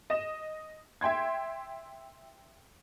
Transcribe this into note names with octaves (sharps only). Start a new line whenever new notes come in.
D#5 E7
E5 G5 C6 G#6